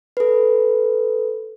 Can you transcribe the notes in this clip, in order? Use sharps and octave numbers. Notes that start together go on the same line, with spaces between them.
A4 B4